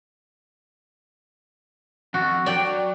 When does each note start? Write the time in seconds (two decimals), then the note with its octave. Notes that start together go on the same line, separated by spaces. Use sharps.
2.14 F2 F#4
2.46 F#3 D5 G5